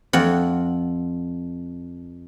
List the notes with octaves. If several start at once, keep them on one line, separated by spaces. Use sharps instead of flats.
F2 F#5